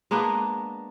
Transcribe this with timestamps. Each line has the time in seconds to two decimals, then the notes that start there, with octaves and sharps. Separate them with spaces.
0.11 G#3 A#3 B3 D4